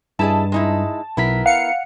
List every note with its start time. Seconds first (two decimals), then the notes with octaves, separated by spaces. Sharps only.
0.19 G2 E4 G#4 D#5 A5
0.52 G#3 D#4 E4
1.17 B1 B3 E4 A#4 B6
1.46 F5 F#5 C#7